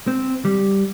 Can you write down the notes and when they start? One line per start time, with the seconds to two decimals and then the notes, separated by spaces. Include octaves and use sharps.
0.07 C4
0.45 G3